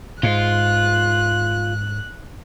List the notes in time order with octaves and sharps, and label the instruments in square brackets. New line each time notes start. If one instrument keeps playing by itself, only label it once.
[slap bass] G#2 [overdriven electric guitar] F4 [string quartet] F#6